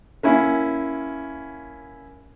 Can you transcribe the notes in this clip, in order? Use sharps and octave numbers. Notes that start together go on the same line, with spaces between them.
A#3 C#4 E4